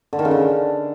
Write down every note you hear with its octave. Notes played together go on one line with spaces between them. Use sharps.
D3
D#3
C#3
D3